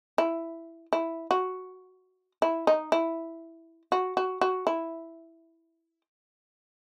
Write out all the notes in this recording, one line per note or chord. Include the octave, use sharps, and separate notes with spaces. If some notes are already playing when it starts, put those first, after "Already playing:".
E4
E4
F#4
E4
D#4
E4
F#4
F#4
F#4
E4